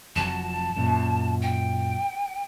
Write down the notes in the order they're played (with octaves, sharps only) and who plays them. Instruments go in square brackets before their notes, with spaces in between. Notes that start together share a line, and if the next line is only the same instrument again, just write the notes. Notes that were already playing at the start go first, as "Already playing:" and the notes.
[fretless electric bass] F1 F#3 [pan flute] A5
[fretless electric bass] F#2 A#2
[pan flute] G5